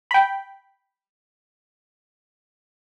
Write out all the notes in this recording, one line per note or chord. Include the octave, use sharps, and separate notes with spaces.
G5 B5